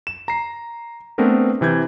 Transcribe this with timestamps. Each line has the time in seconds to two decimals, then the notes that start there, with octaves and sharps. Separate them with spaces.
0.07 E7
0.28 A#5 C7
1.18 A3 B3 C4 D4 A#4 B4
1.61 C3 E3 G6 G#6